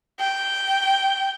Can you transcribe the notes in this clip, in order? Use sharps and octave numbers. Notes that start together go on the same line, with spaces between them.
G5